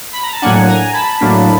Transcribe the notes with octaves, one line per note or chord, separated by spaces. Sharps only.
B5
A#5
A5
A2 F#3 A#3 D4 F#5 G#5
G#5 A#5
A5 B5
A2 F#3 A#3 D4